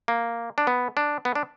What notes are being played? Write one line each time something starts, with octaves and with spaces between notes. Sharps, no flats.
A#3
D4
B3
D4
B3
D4